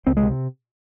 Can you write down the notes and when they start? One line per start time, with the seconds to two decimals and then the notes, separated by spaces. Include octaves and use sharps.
0.06 C#2 C4
0.17 G#3
0.23 C3